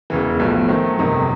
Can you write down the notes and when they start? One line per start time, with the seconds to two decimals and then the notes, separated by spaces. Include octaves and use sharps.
0.10 E1 E2 C#3 E3
0.40 B1 A2 F3
0.68 D#3 F#3 A3 C4
0.99 G1 F2 C3 D#3 F#3